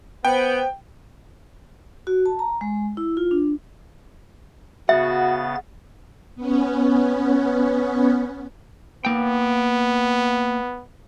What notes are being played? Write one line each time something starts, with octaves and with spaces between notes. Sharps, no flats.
B3 C5 G5
F#4
A5
A#5
G#3
E4
F4
D4
C#3 B3 F#4 E5 F#5 A6
B3 C#4
A#3 B3 G5